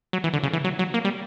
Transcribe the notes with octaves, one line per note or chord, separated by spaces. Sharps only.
F#3
E3
D3
C#3
E3
F#3
F#3
A#3
G3